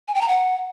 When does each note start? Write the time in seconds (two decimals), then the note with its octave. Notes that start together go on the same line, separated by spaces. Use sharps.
0.08 G#5
0.15 G5
0.21 A#5
0.28 F#5